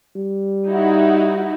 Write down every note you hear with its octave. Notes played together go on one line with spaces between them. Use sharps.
G3
D#4 E4 F#4